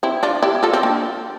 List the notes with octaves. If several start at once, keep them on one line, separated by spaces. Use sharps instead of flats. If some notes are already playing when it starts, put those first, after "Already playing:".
C4 E4
D4 F4
E4 G4
F4 A4
C4
A#3 D4